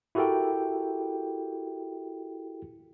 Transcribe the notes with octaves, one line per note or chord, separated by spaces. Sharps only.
E4 F#4 G4 A4 A#4 G5